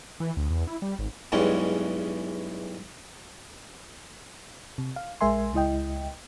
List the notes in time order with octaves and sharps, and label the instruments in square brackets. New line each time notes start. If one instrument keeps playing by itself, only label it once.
[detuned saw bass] E3
D2
E2
E4
G3
G#1
[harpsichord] B1 E2 G2 E3 G#3 C#4
[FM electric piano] C3
F5
A#1 G#3 A#4 E5 G#5 C6
C#2 G#3 E4 D#5 G5